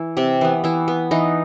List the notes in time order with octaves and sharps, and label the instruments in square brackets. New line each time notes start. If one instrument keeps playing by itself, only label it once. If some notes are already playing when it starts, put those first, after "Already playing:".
Already playing: [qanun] E3 E4
C3 G4
E3 B3
E3 E4
B3
E3 D#4